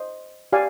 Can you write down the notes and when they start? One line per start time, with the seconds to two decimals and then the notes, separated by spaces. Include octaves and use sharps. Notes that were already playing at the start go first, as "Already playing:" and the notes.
Already playing: C5 D#5
0.53 G4 D5 F5 G#5